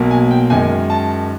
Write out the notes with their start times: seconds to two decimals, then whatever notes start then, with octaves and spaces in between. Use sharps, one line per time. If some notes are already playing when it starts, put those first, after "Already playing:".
Already playing: B1 B2 F#3 A#3
0.11 G#5
0.31 G5
0.50 F#2 D#3 G#3 G#5
0.90 A5